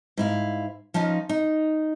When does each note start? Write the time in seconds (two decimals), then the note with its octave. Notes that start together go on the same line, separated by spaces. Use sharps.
0.17 G#2 E4 F5
0.94 F3 C#4 D#4 F4
1.29 D#4